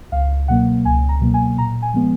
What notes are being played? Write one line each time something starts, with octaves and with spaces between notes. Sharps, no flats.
C#2 F5
B2 F#3 A#3 F#5
C#2 G#5
A#5
B2 F#3 A#3
G#5
A#2 A#5
G#5
F3 G#3 B3